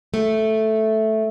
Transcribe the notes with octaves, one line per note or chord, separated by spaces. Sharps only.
A3